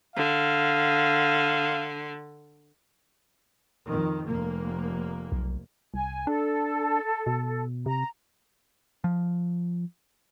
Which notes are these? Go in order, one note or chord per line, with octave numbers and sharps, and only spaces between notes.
D3 F5
F2 D#3
F1 A#3
B1
C2 G#5
D4 A4
B2
C3 A#5
F3